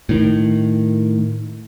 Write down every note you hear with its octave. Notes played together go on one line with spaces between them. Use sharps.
A2 D#3